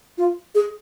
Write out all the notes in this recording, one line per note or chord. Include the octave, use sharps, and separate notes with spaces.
F4
G#4